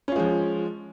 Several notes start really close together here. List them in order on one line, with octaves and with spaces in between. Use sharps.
C#4 F4 G#3 F3